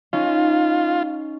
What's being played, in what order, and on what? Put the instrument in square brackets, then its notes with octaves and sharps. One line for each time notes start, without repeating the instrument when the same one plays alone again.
[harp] C#4 D#4 [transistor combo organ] F4